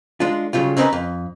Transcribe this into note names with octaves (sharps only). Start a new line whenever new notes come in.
G#3 D4 F4
C#3 F#3 G3 F4
C4 C#4 D#4 E4 A#4 B4
F2